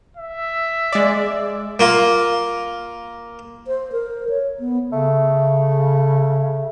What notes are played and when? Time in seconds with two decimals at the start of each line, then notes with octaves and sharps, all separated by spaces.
0.17 E5
0.93 G#3 D5
1.79 A#3 F4
3.67 C5
3.92 A#4
4.29 C#5
4.60 B3
4.92 C#3 A3